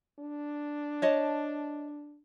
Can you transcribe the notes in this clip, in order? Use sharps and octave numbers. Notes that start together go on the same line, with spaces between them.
D4
C#5 D#5 A5